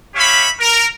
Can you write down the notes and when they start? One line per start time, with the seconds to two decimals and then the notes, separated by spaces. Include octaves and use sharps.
0.15 C#4 G4 C#5 E5 F5 B5
0.59 A#4